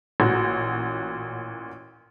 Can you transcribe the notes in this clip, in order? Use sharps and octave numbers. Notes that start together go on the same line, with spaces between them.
A1 A#2 F#4